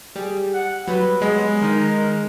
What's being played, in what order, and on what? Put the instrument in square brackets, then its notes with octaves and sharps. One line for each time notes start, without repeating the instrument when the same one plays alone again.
[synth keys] G3 [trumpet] G#4
[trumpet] F#5
[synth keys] F#3 G3 [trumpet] B4
[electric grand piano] G#3 [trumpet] B3
[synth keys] D#3 D#4 [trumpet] A#4